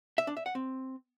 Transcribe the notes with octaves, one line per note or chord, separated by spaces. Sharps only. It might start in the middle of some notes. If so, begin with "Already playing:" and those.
E5
D4
E5
F#5
C4